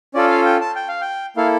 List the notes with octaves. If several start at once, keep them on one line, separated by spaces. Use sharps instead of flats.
C#4 F4 A4 D5
F5
G5
A5
G5
F5
G5
A#3 E4 A4 F5